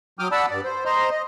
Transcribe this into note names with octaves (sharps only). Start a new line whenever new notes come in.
F#3 G5 D6 D#6 F6
D5 F#5 A5 B5 E6
G2 D5
C5
C5 D#5 A#5 C6
D#5